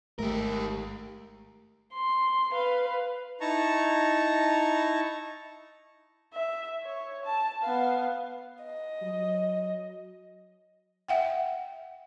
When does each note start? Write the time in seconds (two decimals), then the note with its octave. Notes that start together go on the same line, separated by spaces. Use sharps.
0.19 G#1 G#2 A3 G4 A#4
1.94 C6
2.52 B4 F5
3.41 D#4 E4 A5 A#5 C#6
6.33 E5
6.84 C#5
7.25 A5
7.63 B3 F5
8.62 D#5
9.02 F#3
11.08 E5 F#5 G5